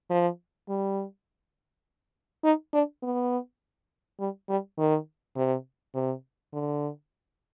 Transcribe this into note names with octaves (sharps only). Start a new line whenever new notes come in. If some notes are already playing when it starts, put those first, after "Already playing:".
F3
G3
D#4
D4
B3
G3
G3
D#3
C3
C3
D3